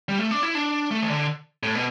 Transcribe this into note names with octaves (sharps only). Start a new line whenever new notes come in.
G3
A3
D4
E4
D4
A3
E3
D3
A2
B2